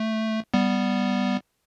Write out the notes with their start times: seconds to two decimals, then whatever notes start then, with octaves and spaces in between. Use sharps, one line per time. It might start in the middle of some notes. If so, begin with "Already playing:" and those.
Already playing: A3
0.54 G3 B3